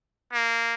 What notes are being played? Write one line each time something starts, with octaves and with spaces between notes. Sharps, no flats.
A#3